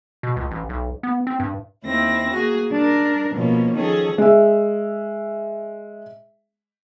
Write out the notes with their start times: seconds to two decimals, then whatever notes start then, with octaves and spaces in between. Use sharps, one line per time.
0.23 B2
0.36 C#2
0.51 A1
0.69 B1
1.03 B3
1.27 C4
1.40 G2
1.84 D#2 C4 E4 A#6
2.32 A#3 F#4 G#4
2.72 D4 A#4
3.34 B2 F3 A#3 C#4
3.74 D#3 F3 C#4 G#4 A4
4.18 G#3 E5